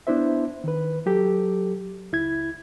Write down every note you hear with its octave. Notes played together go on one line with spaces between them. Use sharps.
B3 D4 E4 C5 E5
D#3 B4
F#3 G4 A4
C#2 E4 G#6